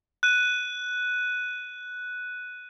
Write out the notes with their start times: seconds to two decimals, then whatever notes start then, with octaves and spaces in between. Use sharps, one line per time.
0.23 F#6 D#7